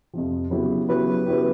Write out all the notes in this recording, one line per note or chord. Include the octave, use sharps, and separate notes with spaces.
F2 C3 F3
C#3 F#3 B3 E4 G4
C#3 F#3 B3 E4 G4 B4
C#3 F#3 B3 E4 G4